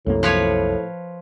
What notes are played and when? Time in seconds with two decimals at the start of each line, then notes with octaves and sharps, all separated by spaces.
0.06 C2 F#2 A2 A#3
0.23 F3 B4 C#5